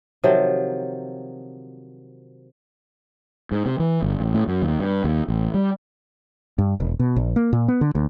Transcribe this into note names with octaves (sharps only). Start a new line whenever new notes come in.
C3 D#3 F3 F#3
G#2
C3
E3
G1
A1
A2
F#2
D#2
G2
D#2
A1
G3
G2
E1
B2
A#1
A#3
A#2
B3
D3
D2